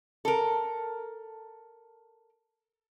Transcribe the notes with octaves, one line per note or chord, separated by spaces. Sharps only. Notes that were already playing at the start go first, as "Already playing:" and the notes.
A4 A#4